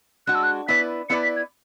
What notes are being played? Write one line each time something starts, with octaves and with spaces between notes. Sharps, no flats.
G#3 D4 F#4 F#6
E6
F#6
B3 E4 B4 D5 B6
B3 E4 B4 D5 C#7
B6
G#6